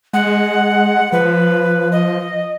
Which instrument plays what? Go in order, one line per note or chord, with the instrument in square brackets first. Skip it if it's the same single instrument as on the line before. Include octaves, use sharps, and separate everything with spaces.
[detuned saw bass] G#3 [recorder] F#5
[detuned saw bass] F3 [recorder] B4
[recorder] D#5